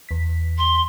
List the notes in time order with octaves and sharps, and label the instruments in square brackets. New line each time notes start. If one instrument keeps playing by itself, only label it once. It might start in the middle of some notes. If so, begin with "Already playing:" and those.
[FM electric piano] E2 B6
[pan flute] C6